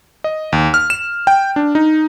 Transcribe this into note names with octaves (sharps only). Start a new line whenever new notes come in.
D#5
D#2
F6
E7
G5
D4
D#4